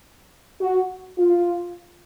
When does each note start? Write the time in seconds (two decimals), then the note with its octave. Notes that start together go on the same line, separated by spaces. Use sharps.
0.61 F#4
1.19 F4